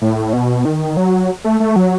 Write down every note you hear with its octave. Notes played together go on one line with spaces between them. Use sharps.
A2
B2
D#3
F#3
A3
A3
F#3